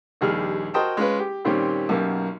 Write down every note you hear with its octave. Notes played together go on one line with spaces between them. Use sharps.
A#1 D#2 G3 G#4 F6
F#4 A#4 C5 D#5 G5 A5
G#3 C#4 F4 B4
G4
A#2 D#3 G3 C4 C#4 G4
B1 F#2 A#3 G4